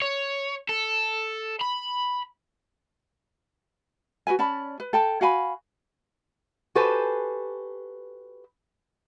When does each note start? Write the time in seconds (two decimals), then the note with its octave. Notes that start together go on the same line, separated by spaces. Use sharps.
0.02 C#5
0.69 A4
1.61 B5
4.27 F#4 A#4 B4 G#5
4.39 C#4 D5 A5 B5
4.80 B4
4.93 A4 G5 A5
5.21 F#4 F5 G#5 B5
6.75 F#4 G4 A4 B4 C5 G#5